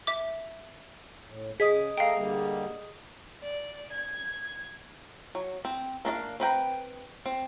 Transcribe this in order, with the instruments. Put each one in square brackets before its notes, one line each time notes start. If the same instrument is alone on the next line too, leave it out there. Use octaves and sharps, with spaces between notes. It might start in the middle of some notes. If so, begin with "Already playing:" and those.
[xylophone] E5 D6
[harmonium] A2
[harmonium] C#3 [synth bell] G#4 D#5 D#6 [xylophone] B6
[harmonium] A3 A4 A#5 [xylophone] F5 G5
[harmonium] D3 G3 A#3
[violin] D5
G#6
[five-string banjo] F#3
C4
A#3 D4 D#5 F5
C4 B4 G5 A#5
C4